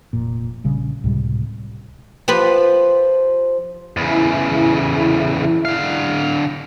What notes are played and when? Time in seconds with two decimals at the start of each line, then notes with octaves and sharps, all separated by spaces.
0.13 F1 A#2
0.64 A#1 C#3 G3
1.04 C#2 A2 C3 G3
2.28 F3 G4 B4
3.97 E2 C#3 E4
5.65 D3 F5